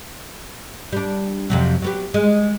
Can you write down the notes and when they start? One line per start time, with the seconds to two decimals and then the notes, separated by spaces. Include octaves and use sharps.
0.92 G3 D4
1.50 F2 C3 F#3
1.82 F#3 B3 G4
2.14 G#3